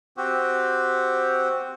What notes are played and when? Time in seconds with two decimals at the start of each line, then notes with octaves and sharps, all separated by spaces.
0.17 C4 F#4 G4